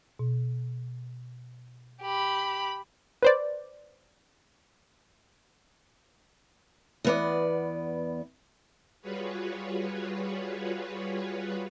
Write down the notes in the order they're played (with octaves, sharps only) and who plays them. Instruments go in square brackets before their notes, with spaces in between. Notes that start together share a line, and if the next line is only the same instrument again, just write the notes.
[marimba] B2
[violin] G4 B5
[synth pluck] B4 C5 D5
[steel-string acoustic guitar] E2 B3 D5
[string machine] G3 F4 F#4 G#4 B4 C#5